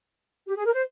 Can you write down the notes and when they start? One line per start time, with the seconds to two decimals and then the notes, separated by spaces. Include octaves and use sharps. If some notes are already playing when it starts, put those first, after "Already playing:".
0.47 G4
0.56 G#4
0.65 A#4
0.74 C5